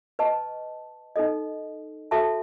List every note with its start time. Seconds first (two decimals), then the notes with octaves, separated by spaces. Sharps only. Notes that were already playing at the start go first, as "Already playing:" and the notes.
0.19 B4 D#5 A5 C#6
1.16 D#4 A4 D#5
2.11 F#4 A4 E5 A5 C#6